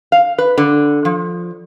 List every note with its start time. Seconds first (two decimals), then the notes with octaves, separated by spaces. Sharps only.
0.12 F5
0.38 B4
0.58 D3
1.05 F3